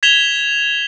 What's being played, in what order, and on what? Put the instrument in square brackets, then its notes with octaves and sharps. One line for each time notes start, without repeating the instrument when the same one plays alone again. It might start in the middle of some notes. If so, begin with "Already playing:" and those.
[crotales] G#6 B6 E7 F7 G7